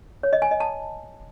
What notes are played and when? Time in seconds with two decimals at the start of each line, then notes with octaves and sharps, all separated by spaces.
0.23 C#5
0.33 D#5
0.42 G#5
0.51 D#5
0.60 A5